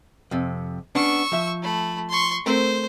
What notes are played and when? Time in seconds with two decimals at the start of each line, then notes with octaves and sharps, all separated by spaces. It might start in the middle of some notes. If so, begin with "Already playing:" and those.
0.31 F2 C3
0.95 B3 C#4 D4 C#6 E6
1.32 F3 E5
1.62 A3 B5
2.09 C6 C#6
2.46 A3 C4 A#4 C5